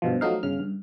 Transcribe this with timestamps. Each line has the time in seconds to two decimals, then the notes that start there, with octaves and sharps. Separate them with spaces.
0.02 G2 B2 F3
0.21 F3 F#3 A3 D#4 F5
0.43 G1 C#3 F6
0.60 G2